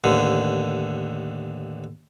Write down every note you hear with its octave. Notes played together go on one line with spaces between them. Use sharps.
A1 D#2 D3